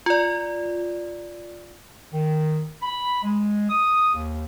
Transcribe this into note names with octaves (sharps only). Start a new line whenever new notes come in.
F4 D5
D#3
B5
G#3
D#6
D#2